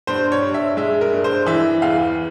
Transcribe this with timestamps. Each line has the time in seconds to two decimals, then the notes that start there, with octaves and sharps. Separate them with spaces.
0.07 G2 C5
0.32 C#5
0.42 G2
0.54 E5
0.77 G#3 E5
1.01 A#4
1.13 G2
1.24 C5
1.46 E3 E5
1.82 E2 F5